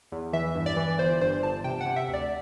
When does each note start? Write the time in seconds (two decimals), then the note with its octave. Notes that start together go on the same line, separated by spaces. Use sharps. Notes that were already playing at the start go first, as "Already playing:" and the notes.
0.12 E2
0.33 E3 E5
0.55 G2
0.66 D5
0.77 E3
0.99 G1 C5
1.21 G2 C5
1.43 G1 A5
1.64 C3 G5
1.81 F#5
1.86 C3
1.96 E5
2.08 D2
2.14 D5